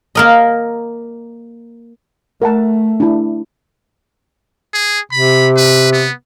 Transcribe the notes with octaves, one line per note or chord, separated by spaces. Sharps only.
A#3 A#4 D#5
A3 A#4 F#5 A5
D4 E4
G#4
C3 B5
B4
B3